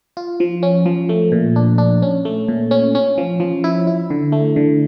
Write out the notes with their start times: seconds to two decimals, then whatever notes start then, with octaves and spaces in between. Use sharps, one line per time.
0.17 F4
0.40 F3
0.63 C#4
0.86 F3
1.09 A3
1.32 A#2
1.56 D4
1.78 D4
2.02 C#4
2.25 A3
2.48 A#2
2.71 C#4
2.95 C#4
3.18 F3
3.40 F3
3.64 E4
3.87 E4
4.10 D3
4.32 A3
4.56 D3